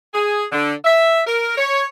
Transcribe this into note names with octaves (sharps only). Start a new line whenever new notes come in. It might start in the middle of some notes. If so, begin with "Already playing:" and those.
G#4
D3
E5
A#4
C#5